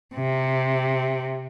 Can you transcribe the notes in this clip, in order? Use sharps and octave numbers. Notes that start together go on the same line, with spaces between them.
C3